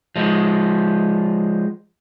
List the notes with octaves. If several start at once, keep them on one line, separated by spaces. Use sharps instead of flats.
F3 G#3